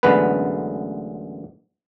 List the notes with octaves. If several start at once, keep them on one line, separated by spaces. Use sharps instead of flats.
A1 F#2 D3 G#3 B3 B4